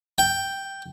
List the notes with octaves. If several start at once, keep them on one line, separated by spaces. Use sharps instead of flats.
G5